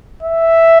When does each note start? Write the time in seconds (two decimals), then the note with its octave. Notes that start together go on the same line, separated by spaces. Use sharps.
0.23 E5